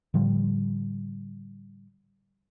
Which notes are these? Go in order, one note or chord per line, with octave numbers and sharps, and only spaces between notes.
A2 D3 F3 G3